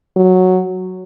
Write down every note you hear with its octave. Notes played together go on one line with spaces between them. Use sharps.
F#3